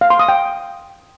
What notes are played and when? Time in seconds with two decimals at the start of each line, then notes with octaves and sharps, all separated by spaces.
0.01 F5
0.10 C6
0.19 D#6
0.29 G5